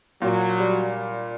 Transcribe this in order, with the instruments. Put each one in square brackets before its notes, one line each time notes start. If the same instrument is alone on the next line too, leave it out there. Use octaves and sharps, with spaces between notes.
[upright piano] A#2 [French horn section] F#3
[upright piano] G3